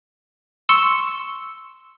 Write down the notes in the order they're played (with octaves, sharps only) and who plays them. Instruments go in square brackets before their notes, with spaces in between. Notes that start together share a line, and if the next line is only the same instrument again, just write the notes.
[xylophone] C6 C#6 E6 C#7 E7